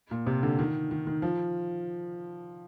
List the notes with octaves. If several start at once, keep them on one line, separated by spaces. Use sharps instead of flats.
A#2
C3
D3
D#3
D#3
D#3
F3